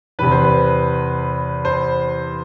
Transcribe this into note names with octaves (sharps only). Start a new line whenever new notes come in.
E2 C3 E3 B4
C5
B4
C5